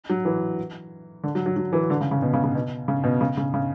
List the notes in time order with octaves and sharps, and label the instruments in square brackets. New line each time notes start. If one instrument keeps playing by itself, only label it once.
[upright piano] F#3
E3
D3
F#3
F#3
F#3
E3
D3
C#3
C#3
B2
C#3
C#3
B2
C#3
B2
C#3
C#3
C#3